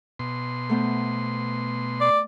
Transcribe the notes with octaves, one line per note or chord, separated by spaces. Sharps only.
B2 C6
A3 B3 C5
D5